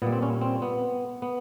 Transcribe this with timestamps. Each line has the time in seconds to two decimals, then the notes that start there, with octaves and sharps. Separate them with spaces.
0.02 A#2 G3 B3
0.13 C4
0.23 C#4
0.41 C4
0.62 B3
1.22 B3